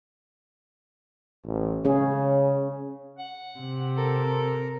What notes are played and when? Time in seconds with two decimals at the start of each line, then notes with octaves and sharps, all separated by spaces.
1.45 A1
1.85 C#3 C#4 G#4
3.19 F#5
3.59 C3
3.97 A4 A#4